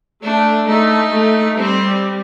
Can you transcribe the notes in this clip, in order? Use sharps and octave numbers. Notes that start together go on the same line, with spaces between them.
A3 D4
A3 D#4
A3
G3 C4